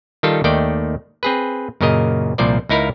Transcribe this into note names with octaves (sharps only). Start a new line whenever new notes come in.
D#3 G3 F4 A4
D#2 D#3 A3 D5 G5
C4 G#4 B4
F#2 A#2 C#3 A#4 D#5
C2 A#2 F3 C5 D5
C#2 D#4 E4 A#4 F5